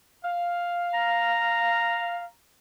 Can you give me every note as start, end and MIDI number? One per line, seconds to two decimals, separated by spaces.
0.24 2.24 77
0.94 2.32 82